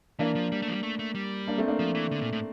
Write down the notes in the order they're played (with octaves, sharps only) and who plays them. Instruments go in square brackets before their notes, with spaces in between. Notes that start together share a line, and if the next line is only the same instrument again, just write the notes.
[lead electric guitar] E3 [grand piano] A#3 D4
[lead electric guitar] F3
G3
A3
F3
G3
A3
A3
G3
[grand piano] A#3 D4
A3 C4
A#3 D4
[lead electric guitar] F3
E3
D3
A#2
A2